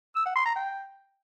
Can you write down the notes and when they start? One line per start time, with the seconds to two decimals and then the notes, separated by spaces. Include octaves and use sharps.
0.15 E6
0.25 F#5
0.35 C6
0.45 A#5
0.55 G5